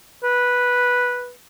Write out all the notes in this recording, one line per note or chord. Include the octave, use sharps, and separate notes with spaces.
B4